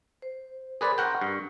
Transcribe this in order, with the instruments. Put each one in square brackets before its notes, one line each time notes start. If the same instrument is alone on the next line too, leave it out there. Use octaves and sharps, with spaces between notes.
[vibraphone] C5
[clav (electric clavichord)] G#4 B4 D5 [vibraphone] A#4 C6
[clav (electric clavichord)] A#4 F#5 G5 [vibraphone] C#6
[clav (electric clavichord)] G2